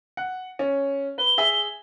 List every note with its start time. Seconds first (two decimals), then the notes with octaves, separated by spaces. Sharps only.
0.17 F#5
0.59 C#4
1.18 B4 G7
1.38 G#4 E5 G#5